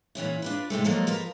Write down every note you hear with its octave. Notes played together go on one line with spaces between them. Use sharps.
A#2 E3 C#4 E4
D4 F4 B4
G#2 C3 G#3 A3
F3 F#3 G#3 A#3 A4
F3 A#4 B4